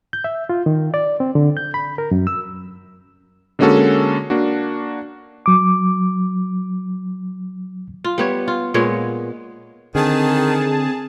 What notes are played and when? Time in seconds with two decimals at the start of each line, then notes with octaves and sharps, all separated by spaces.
0.13 G6
0.24 E5
0.49 F4
0.66 D#3
0.94 D5
1.20 C4
1.35 D3
1.57 G6
1.74 B5
1.98 A#4
2.11 F#2
2.27 E6
3.59 D3 G#3 A#3 C#4 F#4 A4
4.30 A#3 D4 F#4
5.46 F#3 D6
8.04 F4
8.18 G3 B3 C#5
8.48 F4
8.74 A#2 G#3 B3 C#5
9.95 D3 D#3 C4 G#4 A5